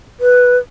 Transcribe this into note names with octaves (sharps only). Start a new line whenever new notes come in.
B4